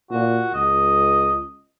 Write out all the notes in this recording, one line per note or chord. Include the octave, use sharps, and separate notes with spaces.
A#2 F#4
C#2 D#5